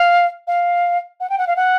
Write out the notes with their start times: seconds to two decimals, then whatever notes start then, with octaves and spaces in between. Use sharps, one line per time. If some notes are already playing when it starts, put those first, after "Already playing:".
Already playing: F5
0.47 F5
1.20 F#5
1.30 G5
1.38 F#5
1.47 F5
1.56 F#5